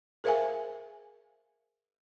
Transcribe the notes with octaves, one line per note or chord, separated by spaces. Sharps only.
G#4 A#4 C5 E5 F5 G#5